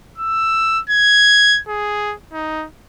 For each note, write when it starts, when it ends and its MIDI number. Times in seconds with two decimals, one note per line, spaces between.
0.18 0.81 88
0.90 1.60 92
1.68 2.15 68
2.33 2.66 63